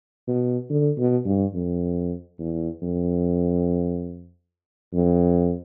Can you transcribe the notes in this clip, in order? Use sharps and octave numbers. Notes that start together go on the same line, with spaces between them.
B2
D3
B2
G2
F2
E2
F2
F2